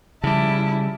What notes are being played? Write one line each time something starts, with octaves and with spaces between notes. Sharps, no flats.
C#3 F3 G3 E4 A5 D6